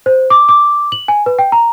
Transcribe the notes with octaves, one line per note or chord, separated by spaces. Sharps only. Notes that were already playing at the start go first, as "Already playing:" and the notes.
C5
D6
D6
F#7
G#5
B4
G5
A#5